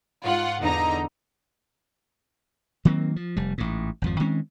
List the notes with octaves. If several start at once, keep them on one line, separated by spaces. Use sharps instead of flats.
G#2 F4 F#5
E2 D3 D#4 A#5
D#3 F#3 A#3 C4
F3
F1 G3
A1 G#2
G#1 F2 F3
D#3 G#3 C4 C#4